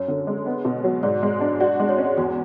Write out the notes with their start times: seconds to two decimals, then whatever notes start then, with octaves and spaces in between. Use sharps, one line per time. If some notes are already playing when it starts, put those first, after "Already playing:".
Already playing: F#2 C#5
0.08 D3
0.27 G#3
0.46 B3
0.65 B2
0.84 F#3
1.03 G#2 D5
1.23 G#3
1.41 D4
1.60 F#4 D5
1.80 G#3
1.89 C#5
1.98 C#4
2.18 E2 F#4